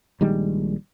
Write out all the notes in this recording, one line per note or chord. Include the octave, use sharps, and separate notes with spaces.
A#1 D#3 G3 G#3